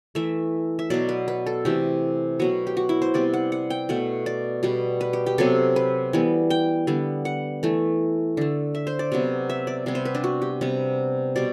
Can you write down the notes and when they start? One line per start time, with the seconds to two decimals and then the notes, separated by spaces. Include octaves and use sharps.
0.15 E3 A3 E5
0.79 E5
0.90 B2 F#3 B3 D5
1.09 B4
1.28 B4
1.46 A4
1.65 C3 E3 A3 G4
2.40 B2 F#3 B3 F#4
2.67 G4
2.77 F#4
2.89 E4
3.02 C5
3.14 C3 G3 B3 D5
3.34 F#5
3.52 F#5
3.70 G5
3.89 B2 A3 F#5
4.26 D5
4.63 B2 G3 B3
5.01 B4
5.13 G4
5.26 G4
5.38 C3 F#3 B3 A4
5.76 B4
6.13 E3 G3 B3
6.50 G5
6.87 D3 G3 B3
7.25 F#5
7.63 E3 A3
8.37 D3 A3
8.75 E5
8.87 C5
8.99 D5
9.12 C3 F#3 B3
9.50 E5
9.67 D5
9.86 C3 G3 B3
9.95 C5
10.05 B4
10.15 D4
10.24 F#4
10.42 G4
10.61 C3 G3 B3
11.36 B2 G3 D5